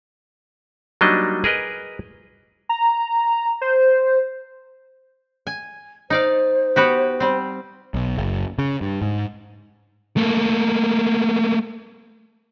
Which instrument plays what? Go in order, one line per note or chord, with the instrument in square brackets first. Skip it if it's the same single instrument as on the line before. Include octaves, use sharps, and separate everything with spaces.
[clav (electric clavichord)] F#3 G3 A#3 D4 D#4 D#5
G#4 A#4 B4 D#5
[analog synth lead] A#5
C5
[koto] G#5
[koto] D#4 D5 F5 [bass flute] C5
[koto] B3 F#4 G4
G3 C4
[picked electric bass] B1
F#1
C#3
G2
G#2
[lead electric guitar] A3 A#3